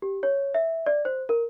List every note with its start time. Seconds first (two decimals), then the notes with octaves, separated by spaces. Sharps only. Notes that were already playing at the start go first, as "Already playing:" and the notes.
0.02 G4
0.23 C#5
0.54 E5
0.86 D5
1.05 C5
1.29 A#4